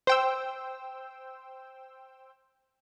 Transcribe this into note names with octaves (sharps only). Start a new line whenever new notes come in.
C5 G5 E6